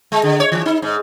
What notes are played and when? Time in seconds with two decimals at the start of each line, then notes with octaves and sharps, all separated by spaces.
0.12 G#3
0.24 D3
0.40 C#5
0.52 E3
0.66 D#4
0.82 G#2